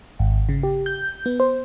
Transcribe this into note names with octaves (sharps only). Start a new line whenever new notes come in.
G#1
C#3
G4
G6
B3
C5